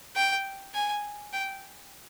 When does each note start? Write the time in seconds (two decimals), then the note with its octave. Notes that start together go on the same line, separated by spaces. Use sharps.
0.16 G5
0.74 G#5
1.33 G5